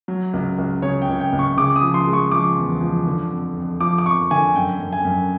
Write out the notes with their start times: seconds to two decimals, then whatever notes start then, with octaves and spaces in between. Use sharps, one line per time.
0.08 F#3
0.33 C#2
0.58 C#2
0.82 C#3 C#5
1.02 G5
1.08 C#2
1.20 G5
1.32 C#2
1.39 C#6
1.57 C#3 D6
1.76 D#6
1.82 F3
1.94 C6
2.07 G#3
2.13 C#6
2.31 F3 D6
2.57 E2
2.81 F3
3.07 D3
3.31 F2
3.56 F2
3.80 F3 D6
3.98 D6
4.05 F2 C#6
4.31 D3 G#5
4.55 F#2 G5
4.80 F#2
4.93 G#5
5.05 F#2